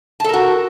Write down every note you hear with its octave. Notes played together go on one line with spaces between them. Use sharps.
F#4 A4 A#4 A5